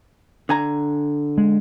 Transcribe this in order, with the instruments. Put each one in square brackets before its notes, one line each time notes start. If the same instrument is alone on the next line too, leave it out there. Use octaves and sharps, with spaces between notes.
[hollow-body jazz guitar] D3 G#5 A#5
[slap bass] G#3